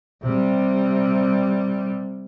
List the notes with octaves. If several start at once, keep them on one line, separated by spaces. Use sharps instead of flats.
C3 G3